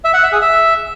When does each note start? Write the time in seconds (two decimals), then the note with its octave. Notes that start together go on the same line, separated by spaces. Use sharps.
0.04 E5
0.14 F#5
0.23 E5
0.32 G#4
0.42 E5